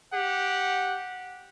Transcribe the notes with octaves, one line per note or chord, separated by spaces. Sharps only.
G4 F#5